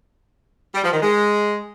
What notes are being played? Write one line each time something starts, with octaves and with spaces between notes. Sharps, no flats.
G3
F3
D#3
G#3